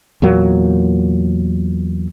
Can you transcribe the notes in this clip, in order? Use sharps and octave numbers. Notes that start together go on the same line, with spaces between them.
E2 A#2 F#3 A#3